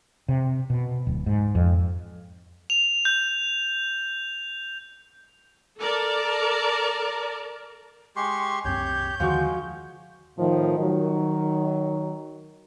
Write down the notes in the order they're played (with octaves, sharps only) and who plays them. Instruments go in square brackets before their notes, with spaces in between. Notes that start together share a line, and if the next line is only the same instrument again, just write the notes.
[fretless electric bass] C3
B2
D1
G#2
F2
[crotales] F7
G6
[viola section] A4 A#4 D5 A5
[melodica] G#3 G4 C6 [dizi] C#6
[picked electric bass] C2 F#2 C4 [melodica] G4 C#5 [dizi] G6
[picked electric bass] D#2 D3 D#3 [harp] F3 F#4 C#6 [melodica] G#3
[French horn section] A2 D#3 F3
D#3 F#3